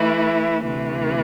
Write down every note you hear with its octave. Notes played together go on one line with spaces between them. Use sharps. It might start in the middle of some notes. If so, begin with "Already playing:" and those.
Already playing: E3 A3 E4
D2 C3 E3